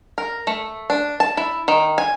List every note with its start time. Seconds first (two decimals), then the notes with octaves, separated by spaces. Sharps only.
0.18 A#4
0.47 A3
0.90 D4
1.20 A5
1.37 E4
1.68 D#3
1.98 G#5